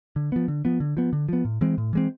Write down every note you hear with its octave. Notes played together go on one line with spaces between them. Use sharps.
D3
F3 B3
D3
F3 B3
D3
F3 B3
D3
F3 B3
A2
E3 G#3 C4
A2
E3 G#3 C4